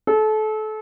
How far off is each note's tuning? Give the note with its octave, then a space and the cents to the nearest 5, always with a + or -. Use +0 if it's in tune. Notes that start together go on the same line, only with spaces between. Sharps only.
A4 -30